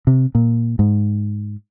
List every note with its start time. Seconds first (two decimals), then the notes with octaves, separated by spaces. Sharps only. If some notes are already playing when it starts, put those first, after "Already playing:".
0.07 C3
0.35 A#2
0.79 G#2